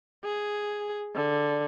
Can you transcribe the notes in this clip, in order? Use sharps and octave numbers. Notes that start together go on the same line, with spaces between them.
G#4
D3